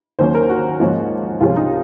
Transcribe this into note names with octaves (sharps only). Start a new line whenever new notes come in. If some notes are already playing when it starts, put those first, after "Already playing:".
D#2 D#3 F#3 A#3 C#4 C5
A#4
F#4
G#2 F3 A#3 C#4
C2 C3 F3 G#3 C#4 F4
D#4